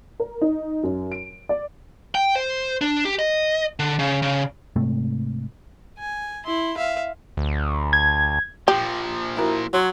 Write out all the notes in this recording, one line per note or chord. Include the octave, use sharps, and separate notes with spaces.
A#4
D#4
F#2
D7
D5
G5
C5
D4
G4
D#5
D3
C#3
C#3
G#2 C3 A3
G#5
E4 C6
E5 F5
D2
G#6
A#2 F3 G4
E4 F#4 A#4
F#3 C#5 C6